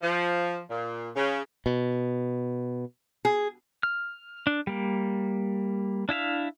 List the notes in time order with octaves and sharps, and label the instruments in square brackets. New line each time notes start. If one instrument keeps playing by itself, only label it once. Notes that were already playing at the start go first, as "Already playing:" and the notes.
[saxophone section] F3
A#2
C#3
[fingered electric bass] B2
[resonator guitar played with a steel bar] G#4
[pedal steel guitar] F6
D4
G3 A#3
D4 E4 E5 F5